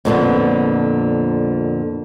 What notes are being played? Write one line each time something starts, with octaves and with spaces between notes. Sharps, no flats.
F2 A#2 D3 B3